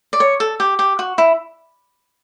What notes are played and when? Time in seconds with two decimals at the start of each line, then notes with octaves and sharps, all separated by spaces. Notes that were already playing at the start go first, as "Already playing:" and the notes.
0.13 D5
0.20 C#5
0.40 A4
0.60 G4
0.79 G4
0.99 F#4
1.18 E4